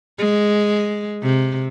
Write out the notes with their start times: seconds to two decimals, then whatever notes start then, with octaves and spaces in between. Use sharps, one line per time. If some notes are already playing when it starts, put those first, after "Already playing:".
0.18 G#3
1.23 C3